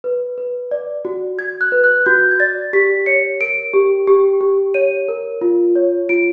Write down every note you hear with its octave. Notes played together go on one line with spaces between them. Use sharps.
B4
B4
D5
F#4
F#4 G#6
F#6
B4
F#6
F#4 G6
G#6
D5 A6
G4 B6
C#5 C#7
A#4 D7
G4
G4
G4
C#5 D#7
A#4
F4
C#5
F4 D7